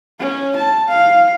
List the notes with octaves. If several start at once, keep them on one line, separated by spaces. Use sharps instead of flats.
C#4
A5
F5